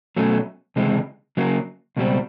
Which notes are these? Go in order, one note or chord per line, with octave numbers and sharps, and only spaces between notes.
B2 F#3 A3 C#4
C#2 C3 E3 G#3
C#3 F#3 A#3
C#2 B2 G3 C4